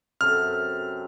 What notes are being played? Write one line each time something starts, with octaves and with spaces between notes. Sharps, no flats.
F#2 C3 A4 F6